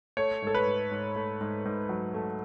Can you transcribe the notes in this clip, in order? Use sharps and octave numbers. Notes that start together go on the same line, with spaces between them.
A3 C#5
G#2 A4
B4
G#2
G#2
A3
G#2
G#2
F#3
A3